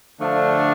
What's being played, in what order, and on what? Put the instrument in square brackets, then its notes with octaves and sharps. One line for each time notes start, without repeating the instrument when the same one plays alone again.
[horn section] D3 F3 A3 D4